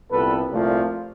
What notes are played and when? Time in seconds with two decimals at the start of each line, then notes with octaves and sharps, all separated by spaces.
0.11 C2 A#2 G3 B3 A4 B4
0.49 C2 A#2 F3 A3